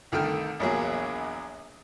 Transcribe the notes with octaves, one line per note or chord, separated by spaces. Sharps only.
C2 D3 D#3 A3 G5 F6
A#1 E2 F#3 A#3 G#4